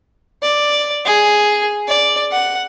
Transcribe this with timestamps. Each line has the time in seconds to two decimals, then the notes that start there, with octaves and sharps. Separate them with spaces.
0.43 D5
1.05 G#4
1.88 D5
2.32 F#5